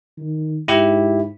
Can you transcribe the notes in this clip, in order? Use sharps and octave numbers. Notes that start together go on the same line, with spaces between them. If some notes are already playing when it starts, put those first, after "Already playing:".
D#3
G#2 E4 G4